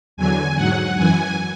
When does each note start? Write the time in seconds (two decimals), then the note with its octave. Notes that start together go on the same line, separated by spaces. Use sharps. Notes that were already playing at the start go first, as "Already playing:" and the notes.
0.17 E2 D3 F#3 G#5
0.56 G#2 F#3 F#5
0.96 F#2 E3 G#5